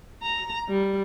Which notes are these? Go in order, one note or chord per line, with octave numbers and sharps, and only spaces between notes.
A#5
G3